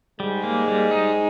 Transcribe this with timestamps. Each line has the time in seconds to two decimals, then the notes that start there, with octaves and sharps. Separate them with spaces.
0.20 G#2 G3 G#3
0.44 A#3
0.68 G3
0.91 D#4